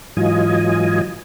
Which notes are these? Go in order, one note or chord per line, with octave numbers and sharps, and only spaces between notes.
G#2 E3 F#3 F4 D#5 G#5